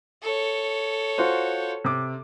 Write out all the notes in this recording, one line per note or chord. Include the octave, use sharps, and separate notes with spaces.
A4 C#5
F4 F#4 C5
C3 D6